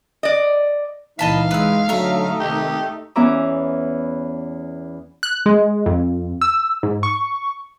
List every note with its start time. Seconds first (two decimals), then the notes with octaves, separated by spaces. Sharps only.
0.23 D5 D#5
1.19 C#2 A#2 E3 D#4 D#5 F5 A5 B5
1.51 G#3 B4 E6
1.89 D3 F#3 A3 D#4 E5 A#5
2.40 C3 D#3 G4
3.16 E2 B3 C#4 E5 A#5 D6
5.23 F#6
5.46 G#3
5.86 F2
6.41 E6
6.83 G#2
7.03 C#6